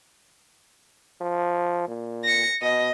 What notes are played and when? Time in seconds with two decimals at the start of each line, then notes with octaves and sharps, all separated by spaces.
1.21 F3
1.88 A#2
2.24 A#6 C#7
2.62 B2 D#5